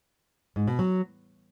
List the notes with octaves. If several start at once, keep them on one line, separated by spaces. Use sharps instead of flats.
G#2
B2
F#3